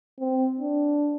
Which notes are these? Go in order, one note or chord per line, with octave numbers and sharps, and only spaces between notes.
C4
D4